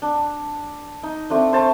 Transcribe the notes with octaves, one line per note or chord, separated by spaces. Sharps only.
D4
D#4
A3 C4 D4
C5 A5 C#6